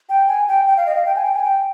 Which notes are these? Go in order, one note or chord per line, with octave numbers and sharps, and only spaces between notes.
G5
G#5
G5
G5
F5
D#5
F5
G5
G#5
G5
G#5
G5